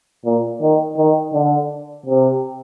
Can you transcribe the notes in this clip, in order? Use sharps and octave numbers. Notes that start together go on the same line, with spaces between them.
A#2
D#3
D#3
D3
C3